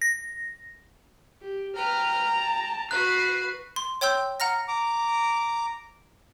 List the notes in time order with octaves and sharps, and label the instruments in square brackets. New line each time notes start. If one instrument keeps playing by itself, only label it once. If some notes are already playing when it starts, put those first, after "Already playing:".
[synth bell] A#6
[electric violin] G4
[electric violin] B4 F6 [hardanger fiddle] G5 [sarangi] A#5
[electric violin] A5
[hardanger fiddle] F#4 B5 [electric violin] B4 C7 [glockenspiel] F#6
[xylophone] C6
C#5 G5 C6 E6 G6
F#5 A#5 F6 A#6
[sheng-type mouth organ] A#5 D6